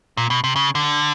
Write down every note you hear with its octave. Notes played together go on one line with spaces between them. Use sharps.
A#2
B2
C3
C#3
D3